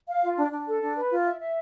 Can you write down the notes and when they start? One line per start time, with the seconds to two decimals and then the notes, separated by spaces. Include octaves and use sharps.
0.08 F5
0.23 F4
0.38 D4
0.52 D4
0.67 A4
0.82 D4
0.96 B4
1.11 F4
1.25 E5
1.40 E5